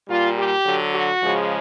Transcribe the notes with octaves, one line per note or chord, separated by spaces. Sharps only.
A#2 G3 F4
G4
D3 F#3
F#4
C#3 F3 G#3